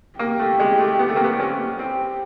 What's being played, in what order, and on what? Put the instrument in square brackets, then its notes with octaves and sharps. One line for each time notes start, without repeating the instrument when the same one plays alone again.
[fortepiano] A#3 [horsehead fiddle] G4
[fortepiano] A3
G#3
A3
B3
A3
A#3
B3
C4
C#4
[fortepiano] C4 [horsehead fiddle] G4